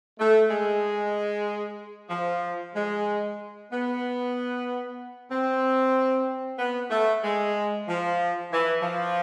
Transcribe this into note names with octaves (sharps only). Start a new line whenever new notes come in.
A3
G#3
F3
G#3
B3
C4
B3
A3
G#3
F3
E3
F3